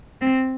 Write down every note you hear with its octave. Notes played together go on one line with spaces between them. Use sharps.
C4